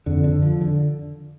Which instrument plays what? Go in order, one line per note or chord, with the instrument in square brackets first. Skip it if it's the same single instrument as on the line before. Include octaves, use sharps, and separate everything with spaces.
[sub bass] F2 [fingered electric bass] D3
[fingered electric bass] D3
F3
D3